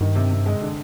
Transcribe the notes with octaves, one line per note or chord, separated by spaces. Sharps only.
G2 D#3
C3
C3
G#3
D3